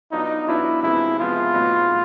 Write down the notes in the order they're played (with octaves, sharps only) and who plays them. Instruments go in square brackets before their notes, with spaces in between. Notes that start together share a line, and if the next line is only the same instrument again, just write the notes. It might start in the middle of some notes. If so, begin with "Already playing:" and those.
[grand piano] F#3 B3 D4 F4 [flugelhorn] D#4
[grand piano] F#3 B3 D4 F4 [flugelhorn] E4
[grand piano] C3 F3 G#3 B3 [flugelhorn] E4
[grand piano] C3 F3 G#3 B3 [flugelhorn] F4
[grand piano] A2 F#3 B3 D#4
A2